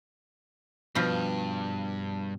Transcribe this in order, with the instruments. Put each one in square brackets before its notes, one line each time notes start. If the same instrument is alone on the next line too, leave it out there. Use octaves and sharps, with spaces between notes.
[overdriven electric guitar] G2 [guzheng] B2 F3